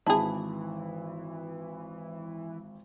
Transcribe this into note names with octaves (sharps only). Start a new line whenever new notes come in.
G#1 E3 E4 G#4 A5 B5